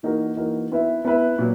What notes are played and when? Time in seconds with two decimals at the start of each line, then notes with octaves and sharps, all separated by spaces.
0.03 E3 A#3 D#4 F#4 A#4
0.37 E3 A#3 D#4 F#4 A#4
0.71 B3 E4 B4 E5
1.05 B3 E4 B4 E5
1.39 A#2 F#3